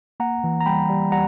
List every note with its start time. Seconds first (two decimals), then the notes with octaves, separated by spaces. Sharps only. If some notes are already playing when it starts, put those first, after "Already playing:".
0.20 A#3 F#5 A#5
0.44 E3
0.61 A#5
0.66 G3 G5 B5
0.89 G3
1.12 G3 F#5 A#5